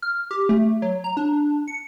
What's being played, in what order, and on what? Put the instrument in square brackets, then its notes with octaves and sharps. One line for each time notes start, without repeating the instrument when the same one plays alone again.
[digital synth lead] F6
G4
A3
F#3
A#5
D4
C#7